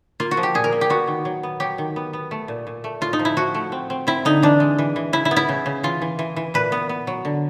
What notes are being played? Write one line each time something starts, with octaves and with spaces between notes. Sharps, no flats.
A#3 F4
F#4
F3
G4
A#2 G#4
A#4
A#3
G4
B3 F#4
D#3
F#3
B3
F#3 G4
D#3
B3
B3
A3
A#2
A#2
A3
A2 F4
D#4
F3
E4
F3 F#4
A3
C4
C4
C4 E4
D3 D#4
E3 D4
G#3
E3
E3
C#3 E4
E4
B3
E4
C#3
C#3
E3 F4
E3
E3
E3
A#2 B4
B3
B3
F#3
D3